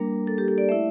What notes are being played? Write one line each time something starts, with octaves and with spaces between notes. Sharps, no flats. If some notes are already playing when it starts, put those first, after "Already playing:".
Already playing: G3 A#3 D4 A#4
A4
G4
A4
D5
A3 E4 E5